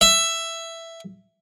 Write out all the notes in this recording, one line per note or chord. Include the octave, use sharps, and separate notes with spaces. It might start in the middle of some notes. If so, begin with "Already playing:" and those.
E5